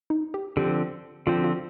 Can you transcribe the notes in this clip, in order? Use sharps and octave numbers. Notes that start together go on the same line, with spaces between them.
D#4
G4
D3 F3 C4 G4
D3 F3 C4 F4
F4